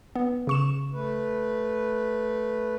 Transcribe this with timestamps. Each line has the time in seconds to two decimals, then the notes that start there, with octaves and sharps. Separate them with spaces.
0.16 B3
0.47 C#3 C#6 E7
0.93 A3 B4